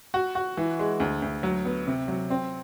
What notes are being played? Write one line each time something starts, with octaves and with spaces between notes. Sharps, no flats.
F#4
F#4
E3
G#3
D2
D2
F#3
B3
C3
F#3
C4